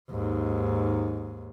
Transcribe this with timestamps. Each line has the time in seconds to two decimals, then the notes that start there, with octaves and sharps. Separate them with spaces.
0.10 D#2 G#2